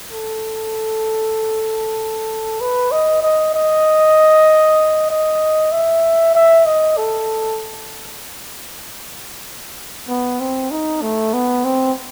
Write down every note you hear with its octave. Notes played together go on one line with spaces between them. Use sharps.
A4
B4
D#5
D#5
D#5
D#5
E5
E5
D#5
A4
B3
C4
D#4
A3
B3
C4